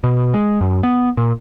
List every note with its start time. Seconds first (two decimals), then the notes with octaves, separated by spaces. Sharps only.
0.04 B2
0.34 G#3
0.61 F#2
0.83 B3
1.17 A#2